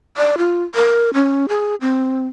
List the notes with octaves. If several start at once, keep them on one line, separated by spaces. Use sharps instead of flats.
D5
F4
A#4
C#4
G#4
C4